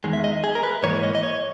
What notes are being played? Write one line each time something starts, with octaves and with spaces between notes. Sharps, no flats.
E2 D#3 G#3
E5
D#5
G#4
A#4
B4
G#2 E3 A#3 C#5
D#5
D#5
C#5